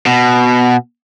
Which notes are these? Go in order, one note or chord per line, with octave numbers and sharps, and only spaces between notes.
B2